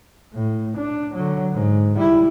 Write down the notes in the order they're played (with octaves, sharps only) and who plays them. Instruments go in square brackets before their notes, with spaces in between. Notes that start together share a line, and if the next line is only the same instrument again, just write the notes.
[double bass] A2
D4
D3 F#3
G#2
G3 E4